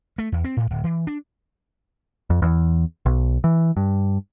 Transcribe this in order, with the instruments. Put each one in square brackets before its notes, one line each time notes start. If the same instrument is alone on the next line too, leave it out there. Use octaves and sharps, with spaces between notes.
[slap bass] A3
E2
C4
A2
D1
E3
D4
[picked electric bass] F2
E2
B1
E3
G2